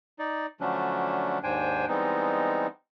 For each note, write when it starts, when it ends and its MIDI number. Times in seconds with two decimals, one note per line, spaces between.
0.19 0.46 63
0.19 0.46 74
0.61 1.39 50
0.61 1.39 53
0.61 1.39 54
0.61 1.39 57
0.61 1.39 61
0.61 1.39 62
1.43 1.86 39
1.43 1.86 44
1.43 1.86 62
1.43 1.86 72
1.43 1.86 79
1.43 1.86 80
1.88 2.67 52
1.88 2.67 55
1.88 2.67 56
1.88 2.67 59
1.88 2.67 60
1.88 2.67 63